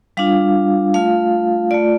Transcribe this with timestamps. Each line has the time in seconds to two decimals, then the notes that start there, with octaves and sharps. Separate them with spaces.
0.17 G3 D4 F4 F5
0.94 A3 F4 F5
1.71 A3 F4 D5